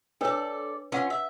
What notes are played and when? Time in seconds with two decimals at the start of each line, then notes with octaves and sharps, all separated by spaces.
0.21 D4 A4 B4 C#5 D5
0.92 C#4 F4 B4 F#5
1.10 E5